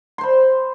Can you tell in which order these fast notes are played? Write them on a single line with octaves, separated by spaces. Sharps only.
C6 C5 B5